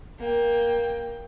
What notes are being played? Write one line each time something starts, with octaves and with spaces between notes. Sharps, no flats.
A#3 G5